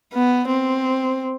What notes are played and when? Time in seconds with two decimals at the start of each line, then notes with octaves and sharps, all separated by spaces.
0.13 B3
0.48 C4